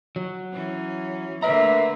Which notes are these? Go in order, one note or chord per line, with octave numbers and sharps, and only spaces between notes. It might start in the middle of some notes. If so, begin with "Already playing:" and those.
F#3
E3 C#4
D3 A3 A#3 B4 E5 A#5